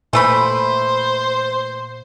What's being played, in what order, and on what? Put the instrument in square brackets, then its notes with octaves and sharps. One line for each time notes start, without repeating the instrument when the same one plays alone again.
[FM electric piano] A#2 [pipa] E3 A3 B5 [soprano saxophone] C5